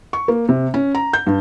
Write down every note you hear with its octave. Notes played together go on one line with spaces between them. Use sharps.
C#6
A#3
C3
C#4
A#5
G6
G2